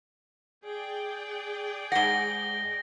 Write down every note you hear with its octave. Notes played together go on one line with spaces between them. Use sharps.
G#4 D5 G5
G#2 F#5 A#6 G7